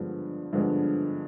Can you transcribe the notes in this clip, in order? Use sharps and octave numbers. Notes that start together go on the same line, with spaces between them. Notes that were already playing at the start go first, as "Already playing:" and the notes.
Already playing: G2 D3 F3 G#3 B3
G2 D3 F3 G#3 B3